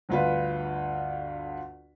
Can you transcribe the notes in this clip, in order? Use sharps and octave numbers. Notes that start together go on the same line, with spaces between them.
G1 D2 F4 B4